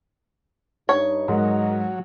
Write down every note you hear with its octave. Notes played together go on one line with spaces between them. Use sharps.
G2 D#4 C#5
G#2 F#3 A#4 D#5